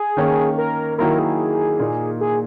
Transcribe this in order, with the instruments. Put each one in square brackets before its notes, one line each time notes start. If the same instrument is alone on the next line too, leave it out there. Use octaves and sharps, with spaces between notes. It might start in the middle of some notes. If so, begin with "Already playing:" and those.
Already playing: [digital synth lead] G#4
[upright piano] D#3 A#3 C#4
[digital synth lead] A#4
[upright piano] D#3 F#3 A#3 E4 [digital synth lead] A#4
[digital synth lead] G#4
[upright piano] A#2 A#3 D#4
[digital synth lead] G#4